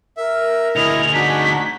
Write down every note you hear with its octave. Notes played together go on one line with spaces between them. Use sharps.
A#4 E5
D2 E4 G#4 D#5 F7
D4 D#4 F#4 B6